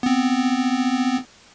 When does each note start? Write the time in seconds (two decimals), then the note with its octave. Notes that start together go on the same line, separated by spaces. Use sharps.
0.03 B3 C4